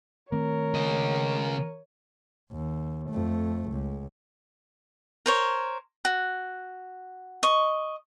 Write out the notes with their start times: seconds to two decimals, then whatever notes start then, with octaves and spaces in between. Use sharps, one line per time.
0.32 D#3 A3 C4 A#4 C#5
0.74 C#3 D#5
2.52 D#2
3.09 F2 A3
3.70 C#2
5.26 A#4 C5 C#5
6.05 F#4
7.43 D#5 C#6